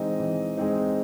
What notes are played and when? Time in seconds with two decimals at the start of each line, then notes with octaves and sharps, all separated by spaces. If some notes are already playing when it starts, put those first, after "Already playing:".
Already playing: E3 G#3 C4 D#4 D#5
0.20 E3
0.57 G#3 C4 D#4